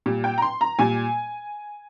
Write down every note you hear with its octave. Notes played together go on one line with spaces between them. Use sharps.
A#2 G3
G5
A#5
C6
A#5
A#2 G3 G#5